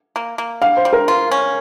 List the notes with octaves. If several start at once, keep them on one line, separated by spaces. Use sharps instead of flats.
A#3
A#3
G3 F5
C5
G3
A#4
F4
C#4